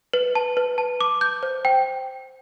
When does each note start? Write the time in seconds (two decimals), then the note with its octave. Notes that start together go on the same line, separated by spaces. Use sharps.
0.14 B4
0.35 A5
0.57 B4
0.78 A5
1.01 D6
1.21 G6
1.43 C5
1.65 G5